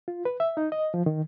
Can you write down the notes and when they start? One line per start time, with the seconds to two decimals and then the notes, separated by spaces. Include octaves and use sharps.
0.08 F4
0.25 B4
0.40 E5
0.57 D#4
0.72 D#5
0.94 F3
1.06 D#3